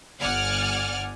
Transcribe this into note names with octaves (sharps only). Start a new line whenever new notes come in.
G1 D5 F#5 G#5 F6